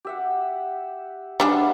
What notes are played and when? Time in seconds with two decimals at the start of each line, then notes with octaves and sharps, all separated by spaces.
0.05 G4 E5 F#5
1.40 G3 D4 G#4 B4 E5 F#5